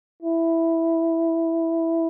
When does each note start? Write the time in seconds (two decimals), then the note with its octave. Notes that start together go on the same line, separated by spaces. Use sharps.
0.22 E4